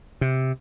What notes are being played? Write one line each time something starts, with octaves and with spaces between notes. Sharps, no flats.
C3